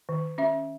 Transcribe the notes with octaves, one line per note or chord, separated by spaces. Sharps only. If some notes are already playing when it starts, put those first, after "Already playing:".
D#3
C#4 E5